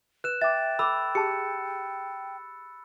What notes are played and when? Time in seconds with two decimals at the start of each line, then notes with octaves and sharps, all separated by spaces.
0.24 B4 F#6 E7
0.42 E5 G5 D6 A6
0.79 A4 B5 D6 E6
1.15 G4 G#4 A5 C#7